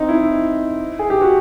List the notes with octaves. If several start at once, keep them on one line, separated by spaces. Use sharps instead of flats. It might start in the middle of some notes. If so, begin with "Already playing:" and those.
Already playing: C4 D#4
E4
G#4
G4
F#4